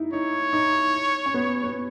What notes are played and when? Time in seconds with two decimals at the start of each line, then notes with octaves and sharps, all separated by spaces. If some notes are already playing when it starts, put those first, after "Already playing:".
Already playing: D#4 E4
0.13 D#4 C#5
0.53 D#4
1.26 C#4
1.34 B3
1.64 B3